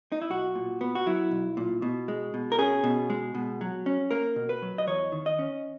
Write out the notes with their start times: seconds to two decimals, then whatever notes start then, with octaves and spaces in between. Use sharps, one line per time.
0.12 D#4
0.22 E4
0.30 B1 F#4
0.55 A#2
0.81 B3
0.95 F#4
1.06 F#3 E4
1.31 B1
1.57 A#2
1.82 B2
2.08 G#3
2.34 B2
2.52 A#4
2.59 C#4 G#4
2.84 B2
3.10 G#3
3.35 B2
3.61 F#3
3.86 C#4
4.11 A#3 A#4
4.36 B2
4.49 B4
4.62 F#3
4.78 D#5
4.87 E2 C#5
5.12 D#3
5.26 D#5
5.39 C#4